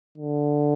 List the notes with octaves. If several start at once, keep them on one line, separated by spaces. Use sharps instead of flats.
D3